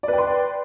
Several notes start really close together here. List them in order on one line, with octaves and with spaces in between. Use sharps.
D5 B4 G5 C6